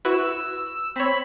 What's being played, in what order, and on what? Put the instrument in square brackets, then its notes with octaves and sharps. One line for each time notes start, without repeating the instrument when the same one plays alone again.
[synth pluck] E4 F#4 B4 [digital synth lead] E6
[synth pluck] C4 C#5 [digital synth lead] B5